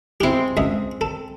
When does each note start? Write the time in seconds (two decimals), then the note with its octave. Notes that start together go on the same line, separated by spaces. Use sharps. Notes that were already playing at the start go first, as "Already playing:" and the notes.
0.21 G#3 C4 E4 G4
0.57 C#2 D#5 E5
1.01 A4